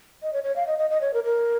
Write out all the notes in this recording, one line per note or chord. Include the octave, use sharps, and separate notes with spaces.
D#5
C#5
C#5
F5
D#5
D#5
D#5
C#5
A#4
A#4